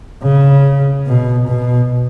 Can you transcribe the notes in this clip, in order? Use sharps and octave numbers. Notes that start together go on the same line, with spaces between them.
C#3
B2
B2